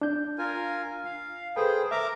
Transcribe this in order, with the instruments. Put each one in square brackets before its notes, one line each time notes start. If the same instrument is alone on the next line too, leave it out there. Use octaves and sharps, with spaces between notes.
[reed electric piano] D4 G6
[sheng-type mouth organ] F4 A#4 G#5
F5
[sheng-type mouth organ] G#4 C5 G5 [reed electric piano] A4 B4
[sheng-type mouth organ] A#4 A#5 D6 [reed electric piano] E5